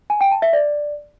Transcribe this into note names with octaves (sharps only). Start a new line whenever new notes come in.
G#5
G5
A5
E5
D5